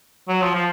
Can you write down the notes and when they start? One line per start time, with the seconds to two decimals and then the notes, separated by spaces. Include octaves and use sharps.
0.28 F#3
0.41 F3
0.55 F3